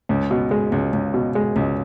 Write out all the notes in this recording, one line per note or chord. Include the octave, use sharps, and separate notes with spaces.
C#2
B2
G#3
C#2
C#2
B2
G#3
C#2